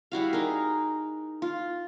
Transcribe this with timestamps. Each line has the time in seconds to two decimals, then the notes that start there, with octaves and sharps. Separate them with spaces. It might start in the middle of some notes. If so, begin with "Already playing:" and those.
0.12 G3 E4 F#4 F5
0.33 D#4 G#4 A#4
1.42 F4